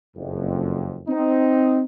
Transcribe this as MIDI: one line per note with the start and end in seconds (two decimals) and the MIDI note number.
0.17 1.01 30
0.17 1.01 41
1.09 1.83 60
1.09 1.83 63